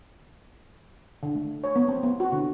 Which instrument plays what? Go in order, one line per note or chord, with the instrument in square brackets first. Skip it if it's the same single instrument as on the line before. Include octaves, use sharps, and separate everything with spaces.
[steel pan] D3
A3
C#5
B3
C4
B3
F#4
D3